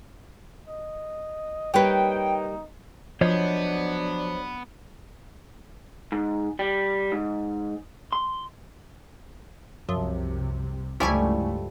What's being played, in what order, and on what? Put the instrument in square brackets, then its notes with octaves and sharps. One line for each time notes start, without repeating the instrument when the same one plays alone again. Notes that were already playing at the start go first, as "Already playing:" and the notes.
[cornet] D#5
[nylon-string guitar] G3 A#3 G4 [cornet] D#4 [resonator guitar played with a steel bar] B4 C#5 [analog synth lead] G5
[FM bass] F3 [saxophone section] F#3 D4 [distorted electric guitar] B3 [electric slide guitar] C5 C#5 D#5
[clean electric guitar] G#2
G3
G#2
C6
[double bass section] C2 C3 [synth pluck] F#2 F3
[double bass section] C#2 G2 A3 [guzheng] F3 G3 [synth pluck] E4 G#5 C#6